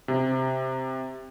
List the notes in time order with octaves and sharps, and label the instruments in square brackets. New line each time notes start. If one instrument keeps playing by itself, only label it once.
[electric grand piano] C3